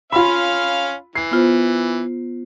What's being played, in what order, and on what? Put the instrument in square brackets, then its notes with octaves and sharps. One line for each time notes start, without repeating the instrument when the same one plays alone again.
[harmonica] C#4 F5 F6 [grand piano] F4 B5
[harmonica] E3 [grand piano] C7
[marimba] B3 F4 C5